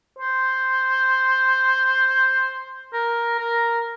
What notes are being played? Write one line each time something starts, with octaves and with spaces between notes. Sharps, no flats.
C5
A#4
A#4